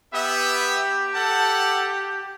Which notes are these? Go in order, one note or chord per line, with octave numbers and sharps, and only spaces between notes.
B3 G4 E5
A4 F#5 A5